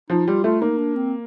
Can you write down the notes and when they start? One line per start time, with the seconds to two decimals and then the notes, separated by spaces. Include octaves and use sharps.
0.10 F3 D#4
0.27 G3 F4
0.44 A3 F4
0.61 A#3 D#4
0.78 D4
0.96 C4